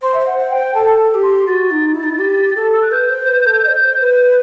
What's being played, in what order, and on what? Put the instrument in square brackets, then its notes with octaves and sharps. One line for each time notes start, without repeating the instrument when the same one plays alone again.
[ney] C5 [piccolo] C6
[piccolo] E5
[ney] C5
[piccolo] F#5
[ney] C5
[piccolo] G5
[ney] C5
[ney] A4 [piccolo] A5
[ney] A4
G4
[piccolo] C6
[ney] F#4 [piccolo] A6
[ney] D#4
E4
D#4
E4
G4
A4
[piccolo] E6
F#6
[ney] B4 [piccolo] G6
[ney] C5
B4
A4
D#5
C5
B4